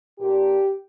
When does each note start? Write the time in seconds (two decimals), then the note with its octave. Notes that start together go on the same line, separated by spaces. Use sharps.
0.19 A#2 A#3 D4 G4